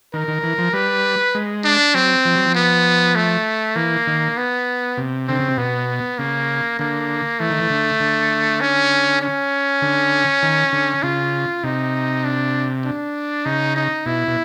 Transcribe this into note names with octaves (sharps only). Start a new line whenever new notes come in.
D#3 A#4
D#3
E3
F3
G3 B4
G#3
D4
F#3 C4
F3
F#3
F3
B3
A3
E3 A#3
D#3
B3
C3
D3 C4
C#3
C3
B2 B3
C#3 A#3
D3 A#3
E3 A3
D#3
E3
D3
D3
C#4
C#4
D3
D#3
D3
C#3 F4
C3 D#4
D4
D4
C#3 D#4
D#4
B2 E4
B2